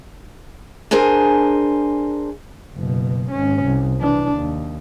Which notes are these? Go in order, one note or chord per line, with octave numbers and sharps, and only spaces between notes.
D4 G#4 A#4 C5 G#5
F#1 B2
G#1 C#4
C2
E3 D4
D#2